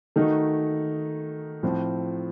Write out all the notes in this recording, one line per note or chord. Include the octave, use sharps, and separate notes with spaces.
D#3 A3 D#4 F#4
A2 F3 C4